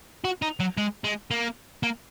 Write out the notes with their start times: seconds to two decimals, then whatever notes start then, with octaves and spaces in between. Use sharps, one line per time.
0.24 F#4
0.42 D#4
0.60 F#3
0.77 G#3
1.04 G#3
1.31 A#3
1.83 A#3